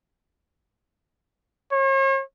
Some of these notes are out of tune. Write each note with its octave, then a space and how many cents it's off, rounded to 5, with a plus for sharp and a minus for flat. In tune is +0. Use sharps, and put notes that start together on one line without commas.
C#5 -45